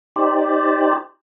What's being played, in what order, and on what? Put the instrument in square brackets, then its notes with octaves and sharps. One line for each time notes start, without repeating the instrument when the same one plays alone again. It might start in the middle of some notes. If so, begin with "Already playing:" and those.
[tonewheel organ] D#4 G4 C5 D5